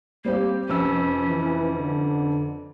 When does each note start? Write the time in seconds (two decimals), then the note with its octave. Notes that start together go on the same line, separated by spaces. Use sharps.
0.25 G3 A#3 C4 G4
0.68 F1 F2 C#4 E6
1.28 E3
1.76 D3